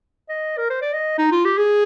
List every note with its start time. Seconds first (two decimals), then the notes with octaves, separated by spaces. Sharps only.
0.29 D#5
0.57 A#4
0.70 C5
0.82 D5
0.93 D#5
1.18 D#4
1.31 F4
1.45 G4
1.58 G#4